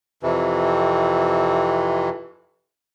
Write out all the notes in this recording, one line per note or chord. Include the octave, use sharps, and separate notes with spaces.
F2 C3 E3